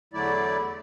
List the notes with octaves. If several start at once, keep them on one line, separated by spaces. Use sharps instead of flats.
E2 D3 F#3 A3 E4 D5